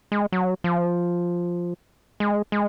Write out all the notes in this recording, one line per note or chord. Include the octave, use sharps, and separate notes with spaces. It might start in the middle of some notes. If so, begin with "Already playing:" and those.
G#3
F#3
F3
G#3
G#3